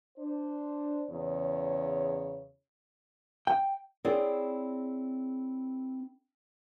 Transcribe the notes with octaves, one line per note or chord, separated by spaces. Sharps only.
D4 C5
E2 C#3 C#5
G5
C4 E4 G#4 C#5 D5